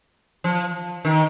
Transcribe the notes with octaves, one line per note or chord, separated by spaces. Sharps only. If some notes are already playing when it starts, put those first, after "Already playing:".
F3
D#3